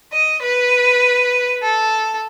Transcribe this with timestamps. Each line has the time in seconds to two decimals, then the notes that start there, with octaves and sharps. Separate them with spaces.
0.13 D#5
0.43 B4
1.62 A4